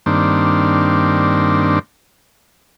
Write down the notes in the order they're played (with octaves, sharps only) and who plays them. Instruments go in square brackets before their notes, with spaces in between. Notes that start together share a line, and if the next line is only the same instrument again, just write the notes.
[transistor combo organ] G2 D#3 A#3 C4 D4